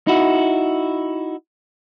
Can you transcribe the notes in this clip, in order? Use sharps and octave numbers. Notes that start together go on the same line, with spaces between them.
D#4 E4 F#4